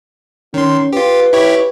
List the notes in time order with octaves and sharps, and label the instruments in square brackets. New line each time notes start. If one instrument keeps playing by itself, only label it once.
[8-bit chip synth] D#3 C6 [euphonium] C#4
[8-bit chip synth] F4 G4 [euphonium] B4
[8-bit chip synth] E4 G4 C#5